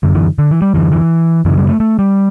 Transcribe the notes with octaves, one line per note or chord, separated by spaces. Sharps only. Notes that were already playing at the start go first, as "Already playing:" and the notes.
F#2 D3
E3
D3
E3
G3
F#2 D3 E3
E3
F#2 C#3 E3
G3
A3
A3
G3